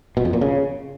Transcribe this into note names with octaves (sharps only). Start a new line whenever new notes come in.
B2
F2
A#2
C#3